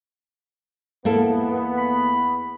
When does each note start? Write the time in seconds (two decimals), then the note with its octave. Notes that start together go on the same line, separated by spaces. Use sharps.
1.05 E2 A#3 B3 E4 A4
1.77 B5